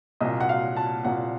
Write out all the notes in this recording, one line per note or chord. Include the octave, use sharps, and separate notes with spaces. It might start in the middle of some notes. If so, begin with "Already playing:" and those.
C2 A#2 D#5
F#5
F5
A5
C2 A#2 F#5